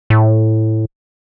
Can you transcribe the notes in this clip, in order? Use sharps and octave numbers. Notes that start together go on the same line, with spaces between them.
A2